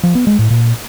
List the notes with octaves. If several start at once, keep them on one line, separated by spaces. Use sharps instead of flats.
F3
B3
G#3
A2
A#2